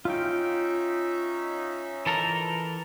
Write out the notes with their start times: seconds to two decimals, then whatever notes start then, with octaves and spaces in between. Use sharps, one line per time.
0.05 C#4 D#4 F4 E5 G5
2.06 E3 A4 A#4